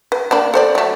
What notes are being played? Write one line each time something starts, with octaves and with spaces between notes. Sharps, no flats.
B4
A#3 D4 B5
A4 C5 D5
F#3 A3